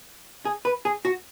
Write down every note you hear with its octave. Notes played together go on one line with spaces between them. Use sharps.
G#4
B4
G#4
F#4